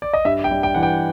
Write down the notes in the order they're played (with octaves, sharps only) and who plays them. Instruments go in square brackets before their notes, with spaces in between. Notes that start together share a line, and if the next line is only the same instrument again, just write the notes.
[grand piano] D5
D#5
[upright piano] G2 [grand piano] E5
[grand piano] G5
[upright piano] G3
[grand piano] G5
[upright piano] E3 [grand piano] F#5
[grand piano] G5